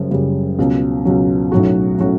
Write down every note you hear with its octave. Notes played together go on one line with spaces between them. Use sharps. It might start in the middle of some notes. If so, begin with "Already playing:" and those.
Already playing: F#1 F#2 C#3 G3
F#1 F#2 C#3 G3
C#2 B2 F#3
C#2 B2 F#3
B1 A2 F#3 C#4 F#4
A2 F#3 C#4 F#4